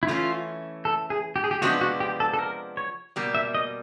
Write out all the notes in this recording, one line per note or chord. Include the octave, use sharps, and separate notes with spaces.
E4
E3 A3 C#4 F4
A4
G#4
G4
G#4
G4
C3 F3 G#3 B3 D4 F#4
F#4
G4
A4
A4
A#4
C#5
B2 G3 A#3
E5
D#5